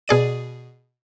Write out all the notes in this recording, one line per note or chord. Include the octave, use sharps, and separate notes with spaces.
B2 G#4 D5 D#7